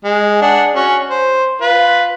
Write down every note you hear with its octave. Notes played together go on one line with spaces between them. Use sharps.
G#3
D4 G#4 F#5
C#4 F#4
C5
F4 B4